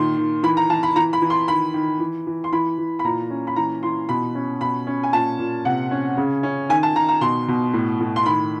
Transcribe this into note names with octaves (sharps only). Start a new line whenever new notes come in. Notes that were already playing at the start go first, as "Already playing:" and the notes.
Already playing: A#2 D#3 C6
D#3
E3 B5
A#5
E3 A5
B5
E3 A#5
B5
E3
C6
D#3 B5
D#3
E3
E3
C6
E3 B5
E3
B5
A#2 A#5
C#4
B5
E3 A#5
E3 C6
B2 B5
C#4
B2 B5
C#4
G#5
A#2 A5
A#2
C3 F#5
C#4
C#3
C#4
D#3 G#5
A5
D#3 A#5
A#5
B2 C6
B2
A2
A2
C6
D#3 B5